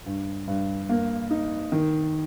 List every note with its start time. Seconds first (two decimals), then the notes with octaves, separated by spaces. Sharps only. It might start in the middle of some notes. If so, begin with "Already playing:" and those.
0.06 G2
0.48 G2
0.89 A#3
1.31 D#4
1.72 D#3